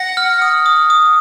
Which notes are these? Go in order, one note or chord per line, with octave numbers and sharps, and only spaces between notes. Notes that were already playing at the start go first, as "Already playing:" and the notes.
Already playing: F#5 A#6
F6
D#6
D#6
D#6